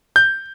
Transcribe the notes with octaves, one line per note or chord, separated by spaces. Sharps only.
G6